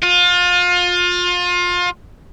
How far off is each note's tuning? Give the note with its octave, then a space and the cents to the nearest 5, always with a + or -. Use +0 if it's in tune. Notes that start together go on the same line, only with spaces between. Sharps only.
F4 +30